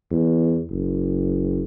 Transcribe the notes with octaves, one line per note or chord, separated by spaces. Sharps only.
E2
F#1